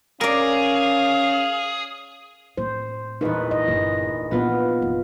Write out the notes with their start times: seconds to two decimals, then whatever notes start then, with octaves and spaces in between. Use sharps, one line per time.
0.21 C#4 G#4 A#4 D5 F5
2.57 A2 C5
3.21 A#1 E2 D#4 B4
3.51 G#2 D#5
3.68 G1
4.31 A#2 B3 D4 F4 B4 F#5
4.82 F1